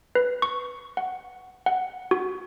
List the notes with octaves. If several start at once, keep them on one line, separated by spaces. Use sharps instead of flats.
B4
C#6
F#5
F#5
F#4